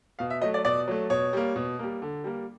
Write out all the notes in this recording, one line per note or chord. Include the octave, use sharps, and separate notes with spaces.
B2 F5
E5
F#3 A3 D#5
D5
B2 D5
F#3 A3
B2 C#5
G3 A#3
B2
G3 A#3
D3
G3 A#3